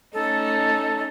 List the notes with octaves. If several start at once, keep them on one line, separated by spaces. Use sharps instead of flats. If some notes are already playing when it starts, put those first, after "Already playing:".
A3 C#4 D#4 A4